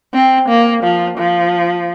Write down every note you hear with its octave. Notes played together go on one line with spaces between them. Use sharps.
C4
A#3
F3
F3